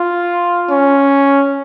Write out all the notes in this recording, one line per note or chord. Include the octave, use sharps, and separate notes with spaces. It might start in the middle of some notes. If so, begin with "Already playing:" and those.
Already playing: F4
C#4